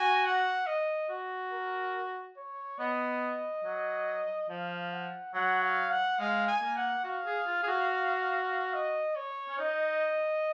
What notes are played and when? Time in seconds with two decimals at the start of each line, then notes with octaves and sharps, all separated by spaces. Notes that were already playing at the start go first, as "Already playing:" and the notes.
Already playing: F#4 G#5
0.25 F#5
0.67 D#5
1.10 F#4
1.52 A#4
2.37 C#5
2.79 B3 D#5
3.64 F#3
4.49 F3 F5
4.92 F#5
5.35 F#3 F#5
5.62 F5
5.91 F#5
6.19 G#3 F5
6.48 G#5
6.62 A#3
6.76 F#5
7.04 F#4 F5
7.25 G#4
7.47 F4
7.63 G#4
7.68 F#4
8.74 D#5
9.16 C#5
9.49 C#4
9.58 D#4 D#5